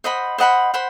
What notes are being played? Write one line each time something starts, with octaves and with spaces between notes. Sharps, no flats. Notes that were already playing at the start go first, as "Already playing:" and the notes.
C5 D#5 F#5 B5
C5 D#5 F#5 B5
C5 F#5 B5